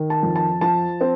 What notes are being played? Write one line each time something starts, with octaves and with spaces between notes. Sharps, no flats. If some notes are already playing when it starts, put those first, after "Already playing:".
Already playing: D#3
A5
F2
A5
F3 A5
C4